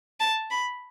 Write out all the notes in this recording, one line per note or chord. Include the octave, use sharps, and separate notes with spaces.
A5
B5